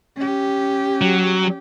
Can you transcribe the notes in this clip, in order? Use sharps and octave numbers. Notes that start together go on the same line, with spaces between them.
C#4 G4
F#3